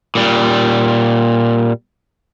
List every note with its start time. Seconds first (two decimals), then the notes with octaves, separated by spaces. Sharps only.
0.15 A#2 G3